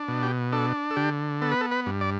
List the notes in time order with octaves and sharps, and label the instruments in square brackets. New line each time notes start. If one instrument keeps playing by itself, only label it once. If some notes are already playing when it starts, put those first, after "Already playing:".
Already playing: [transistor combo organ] D4
B2
G4
D4 A4
A4
D3 G4
B3 A4
B4
A4
B4
G2
D5